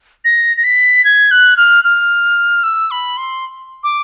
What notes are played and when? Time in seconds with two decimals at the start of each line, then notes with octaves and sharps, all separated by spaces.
0.25 A#6
0.57 A#6
0.64 B6
1.05 G#6
1.31 F#6
1.57 F6
1.84 F6
2.64 E6
2.91 B5
3.17 C6
3.84 D6